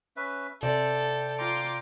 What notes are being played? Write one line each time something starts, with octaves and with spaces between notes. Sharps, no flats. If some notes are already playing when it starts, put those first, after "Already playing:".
C#4 B4 E5
C3 A4 D5 G5
F4 G5 A#5 C6 D6